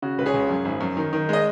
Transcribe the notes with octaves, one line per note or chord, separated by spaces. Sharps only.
C#3 F#4
C#2 B4
G#4 C#5
C#2
F#2
G#1
F#2
D#3
D#3
G#3 D#5